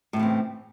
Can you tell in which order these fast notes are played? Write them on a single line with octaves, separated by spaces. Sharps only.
A2 C#3 E3 C4